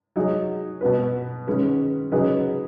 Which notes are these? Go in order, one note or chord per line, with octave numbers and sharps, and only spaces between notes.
F#3 D#4 G#4
B2 B3 F#4 B4
D#3 G#3 C#4 B4
C#3 F#3 D#4 G#4 B4